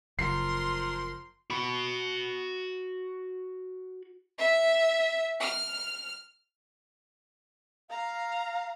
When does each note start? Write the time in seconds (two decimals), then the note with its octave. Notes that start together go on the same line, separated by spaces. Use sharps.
0.19 F#1 F3 A#4 C6 C7
1.50 F#4 B5
4.38 E5
5.40 F6
7.90 F5 A#5